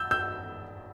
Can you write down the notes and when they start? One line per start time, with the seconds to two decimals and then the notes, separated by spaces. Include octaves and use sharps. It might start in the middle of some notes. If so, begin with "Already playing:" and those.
Already playing: E6 G6
0.11 E6 G6